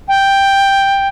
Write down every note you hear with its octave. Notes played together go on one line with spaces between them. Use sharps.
G5